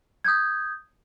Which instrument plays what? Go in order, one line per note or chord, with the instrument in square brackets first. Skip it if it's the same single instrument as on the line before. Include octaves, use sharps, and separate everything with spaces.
[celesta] D#6 G6 G#6